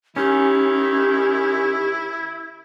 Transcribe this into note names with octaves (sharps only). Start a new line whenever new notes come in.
D#3 C#4 E4 G4